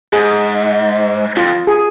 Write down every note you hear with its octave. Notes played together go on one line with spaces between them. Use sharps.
G#2 G#4
F2 F4
G#4